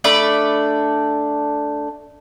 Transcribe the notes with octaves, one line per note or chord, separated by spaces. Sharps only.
A3 D4 D5 B5